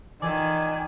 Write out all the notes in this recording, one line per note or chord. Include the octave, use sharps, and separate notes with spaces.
D#3 E3 F4 A4 D5 G#5